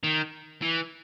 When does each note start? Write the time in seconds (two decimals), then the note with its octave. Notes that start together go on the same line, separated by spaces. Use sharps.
0.04 D#3
0.62 E3